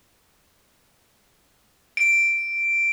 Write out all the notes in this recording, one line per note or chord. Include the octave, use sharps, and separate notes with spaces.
D7